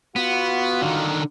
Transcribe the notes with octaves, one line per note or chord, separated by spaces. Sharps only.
B3 F4 F#4
D3 D#3